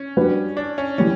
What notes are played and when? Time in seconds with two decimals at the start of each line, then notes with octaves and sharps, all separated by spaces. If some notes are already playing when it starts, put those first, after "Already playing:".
Already playing: C#4
0.17 G3 D4 F#4 B4
0.57 D4
0.78 C#4
0.98 E3 G3 C#4